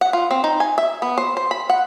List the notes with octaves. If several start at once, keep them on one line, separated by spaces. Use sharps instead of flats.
F#5
F4
C4
D#4
G#5
E5
B3
C5
C5
B5
F#5